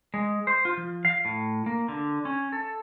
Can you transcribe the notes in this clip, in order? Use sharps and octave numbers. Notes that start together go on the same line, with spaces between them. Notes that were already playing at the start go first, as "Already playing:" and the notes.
G#3
C5
F4
F3
F5
A2
A#3
D3
C#4
A4